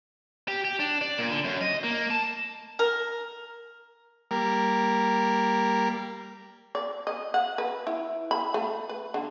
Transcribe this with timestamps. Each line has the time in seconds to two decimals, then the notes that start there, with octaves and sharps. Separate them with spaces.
0.48 G4
0.65 G4
0.79 D4
1.01 D5
1.18 A#2
1.31 D3
1.44 F#2
1.61 D#5
1.84 A#3
2.10 A5
2.79 A#4
4.31 G3 A#3 A#4
6.75 D5
7.07 D#5
7.34 F#5
7.58 B4
7.87 E4
8.31 B5
8.54 A3
8.89 B4
9.14 D3